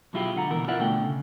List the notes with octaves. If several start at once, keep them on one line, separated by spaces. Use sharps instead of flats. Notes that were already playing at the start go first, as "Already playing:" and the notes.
B2 F#3 G#3 E4 F4 G4
D3 F#5 A#5
B2 E3 A#4
E4 F4 D5 E5 F#5
B2 D3 A3 G5
C#3